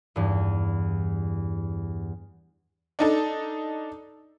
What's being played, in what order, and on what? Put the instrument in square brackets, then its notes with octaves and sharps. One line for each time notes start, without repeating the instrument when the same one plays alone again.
[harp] E2 G2
[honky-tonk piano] D4 D#4 A4